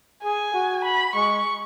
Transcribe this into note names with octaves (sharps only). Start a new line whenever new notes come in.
G#4 G#5
F#4
B5
G#3 C#6